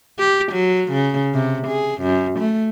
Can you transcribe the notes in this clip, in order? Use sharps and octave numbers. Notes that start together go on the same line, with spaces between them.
G4
F#3
C#3
C3
G#4
F#2
A3